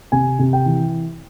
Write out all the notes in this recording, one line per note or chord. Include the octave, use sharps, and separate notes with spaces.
C3 G#5
C3
G5
E3